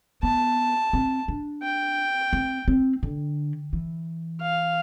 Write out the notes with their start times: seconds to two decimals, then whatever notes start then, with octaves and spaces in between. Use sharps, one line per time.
0.23 B3 A5
0.93 C4
1.28 D4
1.63 G5
2.33 C4
2.68 C4
3.03 D3
3.73 E3
4.42 F5